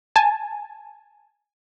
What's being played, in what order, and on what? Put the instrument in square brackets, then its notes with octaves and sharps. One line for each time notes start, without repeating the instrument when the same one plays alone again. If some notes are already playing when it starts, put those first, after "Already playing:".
[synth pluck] G#5 A5